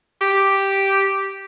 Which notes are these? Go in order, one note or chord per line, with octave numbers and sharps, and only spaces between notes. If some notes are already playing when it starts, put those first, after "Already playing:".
G4